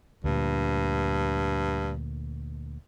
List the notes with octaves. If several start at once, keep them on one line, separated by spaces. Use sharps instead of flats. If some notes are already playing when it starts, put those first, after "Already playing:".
D2 G2 A#2